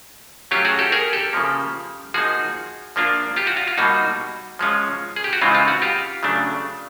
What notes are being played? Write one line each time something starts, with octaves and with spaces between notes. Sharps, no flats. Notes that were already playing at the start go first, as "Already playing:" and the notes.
F#3 A3 C#4 F4 G4
F#4 G#4
G4 A4
G#4 A#4
G4 A4
C#3 F3 A#3
F3 A#3 D#4 F#4 G#4
F3 A#3 D4 F4
F4 G4
F#4
F4
F4
B2 G3 A#3 D#4 F#4
F3 G#3 C#4 F4
G#4
G4
F#4
C#3 E3 G#3 C4 D#4 F4
F4
F#4
F4 G4
C#3 F#3 A3 D4